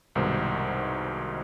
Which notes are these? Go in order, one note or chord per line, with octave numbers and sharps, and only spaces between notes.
C2 G#2 B2 D#3 C5